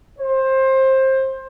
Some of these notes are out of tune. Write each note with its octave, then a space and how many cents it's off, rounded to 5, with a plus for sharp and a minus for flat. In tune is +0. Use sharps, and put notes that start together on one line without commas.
C5 +20